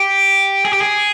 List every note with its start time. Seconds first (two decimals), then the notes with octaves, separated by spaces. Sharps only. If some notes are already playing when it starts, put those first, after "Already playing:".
Already playing: G4
0.65 G#4
0.73 G4
0.81 G#4